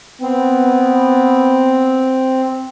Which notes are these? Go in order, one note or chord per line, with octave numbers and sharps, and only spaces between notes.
B3 C4